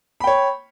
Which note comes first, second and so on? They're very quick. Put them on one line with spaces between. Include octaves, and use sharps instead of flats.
B5 G5 C#5